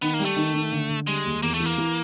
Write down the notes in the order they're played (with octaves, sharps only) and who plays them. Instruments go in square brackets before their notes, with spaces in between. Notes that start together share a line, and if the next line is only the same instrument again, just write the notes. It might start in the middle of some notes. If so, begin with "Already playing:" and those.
[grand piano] D#3 [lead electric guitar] B3
[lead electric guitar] A#3
[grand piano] G3
[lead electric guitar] A3
[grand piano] D#3
D#3
D3
D3
[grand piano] G3 [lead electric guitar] G#3
[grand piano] D#2
[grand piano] E2 [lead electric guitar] A#3
[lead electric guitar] A3
[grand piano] E3
[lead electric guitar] A#3
[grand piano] E3